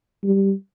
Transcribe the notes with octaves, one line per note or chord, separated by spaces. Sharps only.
G3